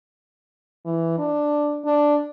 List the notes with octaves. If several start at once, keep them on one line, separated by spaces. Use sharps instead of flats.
E3
D4
D4